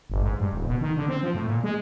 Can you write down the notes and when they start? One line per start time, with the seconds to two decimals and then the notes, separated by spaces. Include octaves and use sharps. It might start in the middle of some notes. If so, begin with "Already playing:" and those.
0.10 G1
0.22 G#2
0.39 G2
0.52 D#1
0.67 B2
0.81 D#3
0.97 D3
1.08 C4
1.23 F3
1.34 A2
1.47 A#2
1.64 G#3